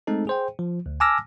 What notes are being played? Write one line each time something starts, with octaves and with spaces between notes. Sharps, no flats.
G#3 A3 C4 D#4 A4
G#4 C5 G5
F3
D2
G#5 A5 D6 E6 F6 A#6